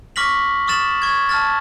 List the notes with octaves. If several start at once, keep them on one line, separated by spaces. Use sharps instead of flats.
C#6 D6 F6 A#6 B6 F#7
C#6 D#6 F6 A6 E7 F#7
C#6 G#6
A5 F6 A6